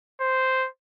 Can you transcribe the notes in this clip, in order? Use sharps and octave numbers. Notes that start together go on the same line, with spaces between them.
C5